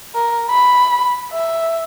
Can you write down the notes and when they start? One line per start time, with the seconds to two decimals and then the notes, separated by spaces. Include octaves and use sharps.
0.15 A#4
0.50 B5
1.32 E5